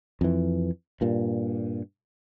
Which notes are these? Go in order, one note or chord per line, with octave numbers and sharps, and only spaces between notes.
F2 E3
G2 A#2